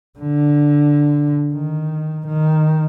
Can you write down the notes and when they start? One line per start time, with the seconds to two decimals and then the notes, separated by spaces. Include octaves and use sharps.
0.19 D3
1.53 D#3
2.27 D#3